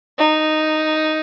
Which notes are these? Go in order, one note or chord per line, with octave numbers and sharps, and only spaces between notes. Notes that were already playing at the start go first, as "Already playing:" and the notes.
D#4